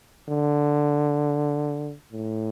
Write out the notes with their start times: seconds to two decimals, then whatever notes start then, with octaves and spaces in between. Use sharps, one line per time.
0.29 D3
2.12 A2